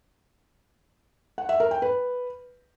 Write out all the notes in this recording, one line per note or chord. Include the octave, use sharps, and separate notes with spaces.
F#5
E5
A#4
G5
B4